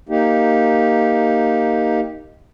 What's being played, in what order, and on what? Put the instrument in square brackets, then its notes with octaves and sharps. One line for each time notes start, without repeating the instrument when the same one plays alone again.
[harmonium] A#3 D#4 G4